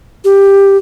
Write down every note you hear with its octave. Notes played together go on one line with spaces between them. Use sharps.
G4